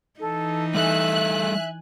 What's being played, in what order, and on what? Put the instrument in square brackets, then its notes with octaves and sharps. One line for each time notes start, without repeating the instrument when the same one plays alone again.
[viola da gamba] E3 D#4 [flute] A4
[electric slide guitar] G3 A3 A4 [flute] E5 [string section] G#5 F#6